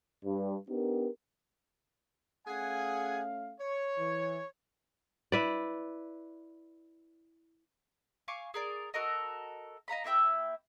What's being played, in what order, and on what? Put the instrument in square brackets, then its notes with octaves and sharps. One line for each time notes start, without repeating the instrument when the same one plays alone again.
[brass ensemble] G2
B3 D4 D#4 G4 A#4
[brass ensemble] A3 C#4 F5 [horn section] G#4 F#5 G#5
[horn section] C#5
[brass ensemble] E3
[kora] E4 B4 D5
[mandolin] F5 G#5 C#6 D6
G#4 A#4 D5
F#4 A4 A#4 D#5
D#5 F5 A#5 B5
A#3 E4 E5 G5